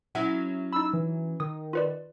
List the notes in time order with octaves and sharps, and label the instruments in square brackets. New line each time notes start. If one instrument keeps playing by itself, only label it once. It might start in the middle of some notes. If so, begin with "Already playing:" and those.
[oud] F#3 C#4 E4 [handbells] F#5
[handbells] D#4 B5 [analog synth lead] E6
[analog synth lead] E3
[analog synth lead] D#3 [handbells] D#6
[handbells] F4 B4 D5